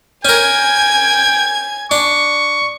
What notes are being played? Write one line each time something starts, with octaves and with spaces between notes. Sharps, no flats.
C#4 A#4 G5 G#5 G#6
D4 C#6